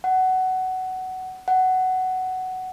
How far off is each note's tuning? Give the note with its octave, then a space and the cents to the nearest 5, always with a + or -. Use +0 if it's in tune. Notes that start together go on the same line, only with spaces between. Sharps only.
F#5 +15
F#5 +10